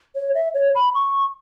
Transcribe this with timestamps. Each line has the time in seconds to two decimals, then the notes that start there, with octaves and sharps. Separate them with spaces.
0.15 C#5
0.35 E5
0.54 C#5
0.75 B5
0.95 C#6